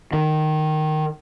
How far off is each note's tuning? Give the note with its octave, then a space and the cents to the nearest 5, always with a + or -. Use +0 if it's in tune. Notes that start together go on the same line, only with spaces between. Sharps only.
D#3 -10